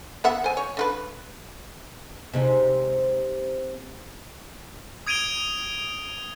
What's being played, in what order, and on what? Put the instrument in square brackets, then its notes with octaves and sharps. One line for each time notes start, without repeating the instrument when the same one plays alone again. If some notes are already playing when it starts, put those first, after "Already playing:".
[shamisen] B3 E5 F#5
C5 G#5
C#5
D3 F4 B4
[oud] C3 G#3 D#4
[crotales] D#6 G#6 D7 D#7 F7 G7